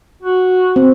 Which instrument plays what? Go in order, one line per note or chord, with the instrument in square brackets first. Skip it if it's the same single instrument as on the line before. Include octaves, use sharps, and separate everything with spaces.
[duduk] F#4
[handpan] C4